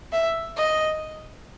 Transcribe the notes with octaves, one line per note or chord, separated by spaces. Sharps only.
E5
D#5